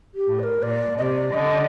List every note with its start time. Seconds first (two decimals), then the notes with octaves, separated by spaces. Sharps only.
0.15 G4
0.27 A2
0.39 D5
0.43 A#4
0.62 A#2 D5
0.98 C3 D5 D#5
1.34 D3 D#5